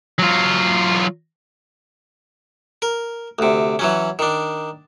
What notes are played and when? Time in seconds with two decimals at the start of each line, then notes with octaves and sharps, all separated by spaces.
0.19 F#3 F4
2.82 A#4
3.39 D2 C3
3.79 E3 F#3 C#4
4.19 D#3 D4